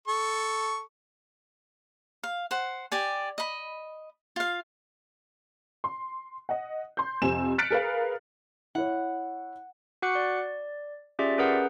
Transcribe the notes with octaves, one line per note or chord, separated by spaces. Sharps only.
A4 C#6
F5
C5 F#5
G4 D5 G#5
D#5 B5
F4 F5
C6
D#5 F#5
C6 G6
F2 C3 C4 G#5 E7
F6 F#6 A6 B6 C#7 D7
G#4 A#4 B4 F5
E4 C#5 F#5
F#4 F#5 C#6 D6 F#6 C#7
D5
C#4 F4 G4 G#4 D5 E5
C#4 G#4 A#4 B4 F#5 G6